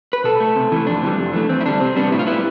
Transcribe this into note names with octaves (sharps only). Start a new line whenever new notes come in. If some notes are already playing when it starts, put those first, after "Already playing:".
B4
B2 A4
A3
C3
E3 A3
F2 D4
C3 E3 G3
F2
E3 A3
E2 C4
E4
D3 G3 D4
C3 C4
G3 B3 D4
A2 E4
F4
G3 B3 E4